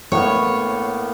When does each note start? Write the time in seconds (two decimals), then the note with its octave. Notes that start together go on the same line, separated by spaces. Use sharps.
0.12 A2 A#3 B3 C#5